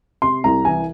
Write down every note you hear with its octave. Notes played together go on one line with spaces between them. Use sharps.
C3 C6
C2 A#5
E3 G#5